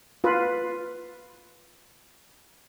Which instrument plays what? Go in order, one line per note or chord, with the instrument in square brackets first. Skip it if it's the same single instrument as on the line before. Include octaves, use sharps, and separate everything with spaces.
[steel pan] F4 B4